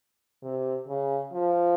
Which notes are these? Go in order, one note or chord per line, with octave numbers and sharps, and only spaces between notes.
C3
C#3
F3